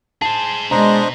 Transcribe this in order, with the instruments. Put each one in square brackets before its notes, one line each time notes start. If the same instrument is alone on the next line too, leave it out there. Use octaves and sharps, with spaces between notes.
[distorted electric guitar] G#4 C5 [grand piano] A5
[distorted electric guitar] B2 [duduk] G#3 [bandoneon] D4 C5 D#5 [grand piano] A#5